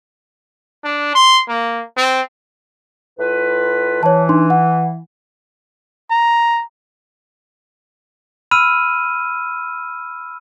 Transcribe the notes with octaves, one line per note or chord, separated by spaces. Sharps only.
D4
C6
A#3
C4
A2 F4 B4
E3 C#5 A5
D4 D#4 C6
F#5
A#5
B5 E6 F6 D#7